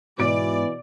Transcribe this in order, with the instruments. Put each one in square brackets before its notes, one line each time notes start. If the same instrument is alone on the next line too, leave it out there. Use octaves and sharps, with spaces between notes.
[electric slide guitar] G#2 [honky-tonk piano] B2 D7 [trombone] E3 [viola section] D5